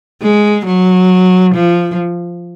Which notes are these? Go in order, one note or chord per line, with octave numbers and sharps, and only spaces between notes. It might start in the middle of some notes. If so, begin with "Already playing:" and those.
G#3
F#3
F3